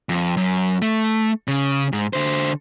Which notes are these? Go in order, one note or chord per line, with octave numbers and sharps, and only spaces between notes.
F2
F#2
A3
C#3
G#2
D3 C5